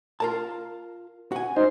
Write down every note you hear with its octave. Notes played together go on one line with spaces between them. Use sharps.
F4 A#4 A5
F#4 G#5
D#4 C5